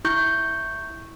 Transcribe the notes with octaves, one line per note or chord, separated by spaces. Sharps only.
E4 C#6 G6